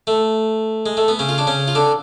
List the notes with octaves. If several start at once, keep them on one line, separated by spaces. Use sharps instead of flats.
A3
G#3
A3
B3
C#3 C#4
F4
D4
C#3 C#4
F4
D3 D4